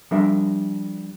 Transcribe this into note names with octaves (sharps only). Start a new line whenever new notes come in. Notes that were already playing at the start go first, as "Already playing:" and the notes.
F3 G3 D4 A#4 E5